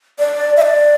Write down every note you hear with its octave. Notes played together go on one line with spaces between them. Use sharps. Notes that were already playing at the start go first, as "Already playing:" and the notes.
D5
E5
D5